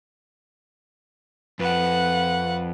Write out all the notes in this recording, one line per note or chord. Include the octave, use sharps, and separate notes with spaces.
F2 B4 F#5